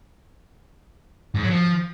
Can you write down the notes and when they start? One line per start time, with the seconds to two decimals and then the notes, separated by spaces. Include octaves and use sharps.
1.35 G#2
1.42 F#3
1.50 F3